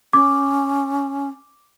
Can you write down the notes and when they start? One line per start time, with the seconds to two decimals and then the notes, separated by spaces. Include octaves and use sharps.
0.13 C#4 D6